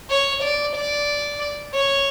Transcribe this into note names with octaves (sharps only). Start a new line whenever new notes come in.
C#5
D5
D5
C#5